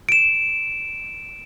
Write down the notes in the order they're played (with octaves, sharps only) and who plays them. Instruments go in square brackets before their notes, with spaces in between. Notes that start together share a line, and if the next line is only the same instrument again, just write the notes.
[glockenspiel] D7 E7